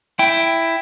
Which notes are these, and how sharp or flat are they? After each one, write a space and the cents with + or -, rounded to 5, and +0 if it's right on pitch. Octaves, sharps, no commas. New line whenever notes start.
E4 +5 G5 +0